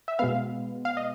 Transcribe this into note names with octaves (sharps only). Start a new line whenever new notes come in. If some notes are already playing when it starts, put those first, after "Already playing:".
E5
B2 G#3 B3 F5
F5
D#5